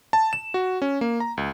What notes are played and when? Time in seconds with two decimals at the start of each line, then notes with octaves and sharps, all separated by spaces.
0.13 A5
0.33 E7
0.54 F#4
0.82 C#4
1.01 A#3
1.20 A#5
1.37 C#2